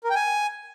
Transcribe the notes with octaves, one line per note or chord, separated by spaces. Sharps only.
A#4
G5
G#5